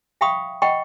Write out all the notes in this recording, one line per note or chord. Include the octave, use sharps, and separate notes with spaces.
E5 F5 G5 B5 C#6 D#6
D#5 F#5 G5 B5 C#6